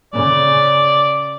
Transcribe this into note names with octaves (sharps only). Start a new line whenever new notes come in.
C#3 D5